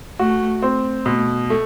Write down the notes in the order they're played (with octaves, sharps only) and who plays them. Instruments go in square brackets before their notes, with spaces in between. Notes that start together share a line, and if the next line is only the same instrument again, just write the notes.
[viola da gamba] A3 [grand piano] F#4
[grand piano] C4
[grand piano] B2 [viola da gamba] A3
[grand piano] A3